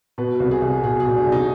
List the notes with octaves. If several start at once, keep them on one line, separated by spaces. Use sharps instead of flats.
B2 B4
C2
G#4
C2
B2 G#4
G#4
B2
D4
C2
D#4